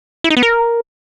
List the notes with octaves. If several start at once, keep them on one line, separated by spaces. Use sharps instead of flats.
E4
D#4
B3
A#4